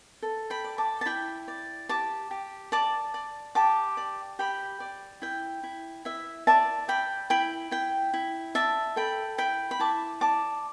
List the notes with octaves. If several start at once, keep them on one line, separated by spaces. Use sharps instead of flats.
A4
G5 B5
D5
A5 D6
A5
E4 G5 B5
D5
G4 A5 D6
G4
D5 A5 D6
D5
G4 A5 D6
D5
G4 G5 B5
D5
E4 G5
E4
E4 E5
D5 E5 A5
D5 G5 B5
E4 G5 B5
E4 G5
E4
D5 E5 A5
A4 G5 B5
E4 G5 B5
B5
E4 A5 D6
D5 A5 D6